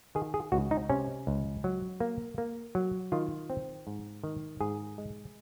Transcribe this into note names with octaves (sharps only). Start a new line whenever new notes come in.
D#3 G#4
G#4
C#2 F#4
D#4
C3 C#4
C#2
F#3
A#3
A#3
F#3
D#3 F4
C4
G#2
D#3
G#2 G#4
G#3